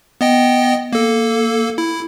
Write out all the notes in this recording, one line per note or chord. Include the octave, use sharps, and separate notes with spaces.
B3 D#5 G5
A#3 A4
E4